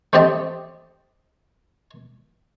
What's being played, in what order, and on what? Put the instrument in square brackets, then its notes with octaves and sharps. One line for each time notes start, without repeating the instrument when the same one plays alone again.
[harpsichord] A3 C4 G4 D#5 A5